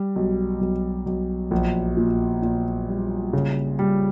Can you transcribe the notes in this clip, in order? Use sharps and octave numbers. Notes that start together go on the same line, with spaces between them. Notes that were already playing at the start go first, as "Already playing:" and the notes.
Already playing: G3
B1
B1
B1
A#1
A#2
A#2
G3
C#3
G3